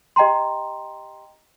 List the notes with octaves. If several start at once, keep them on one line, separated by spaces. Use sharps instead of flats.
G4 D#5 G5 A#5 C6